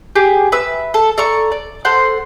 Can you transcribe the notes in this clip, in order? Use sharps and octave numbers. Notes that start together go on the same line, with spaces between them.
G4 G#4 D6
B4 E5 E6
A4
A4 D5 A#5 C#6
D5
A4 C5 F#5 C6